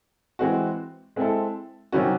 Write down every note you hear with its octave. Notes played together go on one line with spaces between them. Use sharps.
E3 G#3 C4 F#4
G#3 C4 E4 A4
C3 D#3 F#3 C#4 F#4